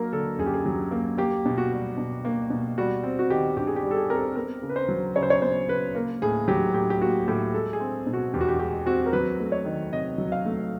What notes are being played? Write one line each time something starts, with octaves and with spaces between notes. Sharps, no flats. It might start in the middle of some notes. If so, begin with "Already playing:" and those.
Already playing: F#3 A#3 A#4
D3 A4
F#2 G#4
G4
G#4
F#3
A#3
A#3 G4
B2
F#4
G3
B2
A#3
B2
G3 F#4
C4
F#4
D#3 G4
G2 G4
G#4
G4
G3
A4
G#4
C4 A#4
A4
B3 A#4
C#3
B4
C5
F#3
C#3 C#5
C5
C#5
B3 C5
C#3 B4
A#3 A#4
A2 G#4
F#3 G4
A2 G4
G4
A#3 F#4
A2 G4
G#3 A4
G#4
C4
B2
F#4
E2 G4
F#4
G4
G#3 G4
C4 F#4
A#4
F#3 B4
A3
C#5
D#3
C3 D#5
F#3
F5
A3